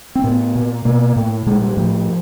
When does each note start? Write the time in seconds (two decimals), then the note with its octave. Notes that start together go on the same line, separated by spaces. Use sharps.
0.15 C4
0.24 A2 B3
0.55 A#2
0.85 B2 A#3
1.16 A2
1.46 A#2 G#3
1.62 G3
1.77 A2 F3